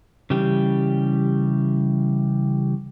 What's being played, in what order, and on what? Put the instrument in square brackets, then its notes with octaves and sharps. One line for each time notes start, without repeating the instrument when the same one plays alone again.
[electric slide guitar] C#3 E3 G3 G4